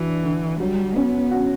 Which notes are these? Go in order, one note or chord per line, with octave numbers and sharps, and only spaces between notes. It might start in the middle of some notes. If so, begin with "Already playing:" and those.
Already playing: E3 D4 F#4
D3
F#3 G3
B3 C#4
F#4